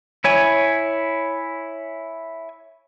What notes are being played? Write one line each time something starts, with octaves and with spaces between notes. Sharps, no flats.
E4 C#5 G#5